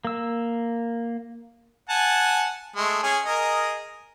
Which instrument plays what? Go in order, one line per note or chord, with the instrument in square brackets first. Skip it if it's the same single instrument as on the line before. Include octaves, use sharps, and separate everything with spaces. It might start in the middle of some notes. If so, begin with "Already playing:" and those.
[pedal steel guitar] A#3 E6
[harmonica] F#5 G#5 A5
G#3 A3
C#4 G#4
G#4 A#4 D#5